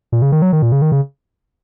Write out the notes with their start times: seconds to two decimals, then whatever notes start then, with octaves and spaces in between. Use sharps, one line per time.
0.12 A#2
0.22 C#3
0.32 D#3
0.42 F#3
0.53 D#3
0.62 A#2
0.72 C#3
0.82 D#3
0.92 C#3